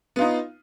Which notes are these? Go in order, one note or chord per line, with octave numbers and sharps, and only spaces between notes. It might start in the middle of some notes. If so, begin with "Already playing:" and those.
B3 D#4 F4